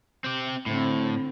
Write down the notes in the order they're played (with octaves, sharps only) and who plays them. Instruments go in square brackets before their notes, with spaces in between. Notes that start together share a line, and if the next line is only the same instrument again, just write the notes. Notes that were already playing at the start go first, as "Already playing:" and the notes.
[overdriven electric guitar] C4 G4
[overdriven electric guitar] A2 [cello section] D3 C4